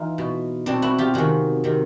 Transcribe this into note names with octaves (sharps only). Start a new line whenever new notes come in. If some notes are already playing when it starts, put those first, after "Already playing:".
Already playing: E3 D#4 F4
B2
B2 C4 D4
E4 F#4
F4 G4
C3 D#3 F#4 G#4
C3 D#3